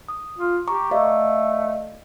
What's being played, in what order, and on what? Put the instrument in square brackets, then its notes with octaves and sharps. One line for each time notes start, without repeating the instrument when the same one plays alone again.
[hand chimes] D#6
[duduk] F4
[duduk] G4 [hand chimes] A#5 C#6 D6
[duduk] A3 [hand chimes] D5 D#5 F5